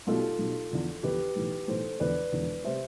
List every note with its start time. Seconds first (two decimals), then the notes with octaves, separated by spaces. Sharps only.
0.07 B1 B2 G3 F4 A4
0.39 B1 B2 G3
0.71 E2 D3 F3
1.03 E2 D3 F3 G4 B4
1.36 B1 A2 E3
1.68 B1 A2 E3 A4 C5
1.99 E1 E2 D3 F3 B4 D5
2.32 E1 E2 D3 F3
2.64 C3 G3 C5 E5